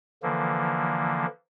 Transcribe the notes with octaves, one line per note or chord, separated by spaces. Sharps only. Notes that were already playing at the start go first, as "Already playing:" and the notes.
D3 E3 F3 A#3